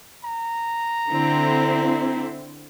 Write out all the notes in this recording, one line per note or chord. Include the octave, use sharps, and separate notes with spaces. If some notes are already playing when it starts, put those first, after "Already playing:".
A#5
D3 C4 E4